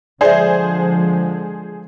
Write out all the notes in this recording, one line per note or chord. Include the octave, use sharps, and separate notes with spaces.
D3 F3 G#3 G#4 C5 D5 E5